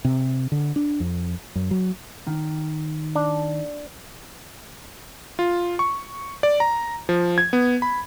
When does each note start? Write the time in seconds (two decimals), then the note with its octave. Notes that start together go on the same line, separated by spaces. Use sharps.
0.05 C3
0.52 D3
0.76 D4
1.00 F2
1.55 F#2
1.71 F#3
2.27 D#3
3.15 D4
5.39 F4
5.79 C#6
6.43 D5
6.60 A#5
7.09 F3
7.38 G#6
7.53 B3
7.82 B5